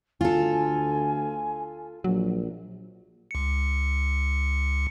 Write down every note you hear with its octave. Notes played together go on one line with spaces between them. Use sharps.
D2 F4 A4 G#5
A#1 F#3
C#2 C#7